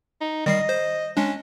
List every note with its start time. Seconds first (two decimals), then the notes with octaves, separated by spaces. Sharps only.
0.21 D#4
0.46 D#3 G3 D#5 C7
0.69 C5
1.17 G#3 C#4 D4